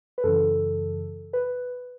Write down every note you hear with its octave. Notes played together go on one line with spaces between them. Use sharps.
B4
F#2 C#3 E3 A4
B4